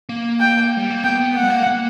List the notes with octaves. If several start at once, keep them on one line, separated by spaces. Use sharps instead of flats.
A#3
G5
G3
A#3
B3 G5
B3
A#3 F#5
G3
A#3
A#3